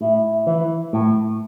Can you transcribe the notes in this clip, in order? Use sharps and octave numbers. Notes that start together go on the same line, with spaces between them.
A2 E4
E3
A2